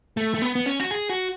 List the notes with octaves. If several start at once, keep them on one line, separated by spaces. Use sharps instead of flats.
A3
A3
B3
B3
C#4
F#4
G#4
F#4